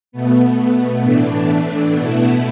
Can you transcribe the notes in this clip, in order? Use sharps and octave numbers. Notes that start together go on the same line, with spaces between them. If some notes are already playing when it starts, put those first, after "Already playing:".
B2 A3 B3
A2 E3 A3 D4
B2 A3 B3 E4